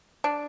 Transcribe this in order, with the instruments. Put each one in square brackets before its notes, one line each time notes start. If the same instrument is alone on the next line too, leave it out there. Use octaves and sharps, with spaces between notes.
[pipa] D4